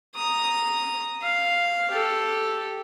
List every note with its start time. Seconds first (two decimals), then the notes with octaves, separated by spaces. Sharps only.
0.15 A#5 D#6
1.23 F5
1.91 G4 A4